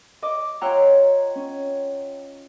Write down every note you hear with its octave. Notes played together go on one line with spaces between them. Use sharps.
D#5 D6
F4 C#5 F#5 G5 A#5 E6
C#4